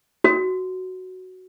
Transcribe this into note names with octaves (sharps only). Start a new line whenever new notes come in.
F#4